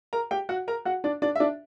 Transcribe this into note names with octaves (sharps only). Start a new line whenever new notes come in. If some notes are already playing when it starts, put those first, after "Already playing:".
A#4 A#5
G4 G5
F#4 F#5
A#4 A#5
F#4 F#5
D4 D5
D4 D5
E5
D4 D5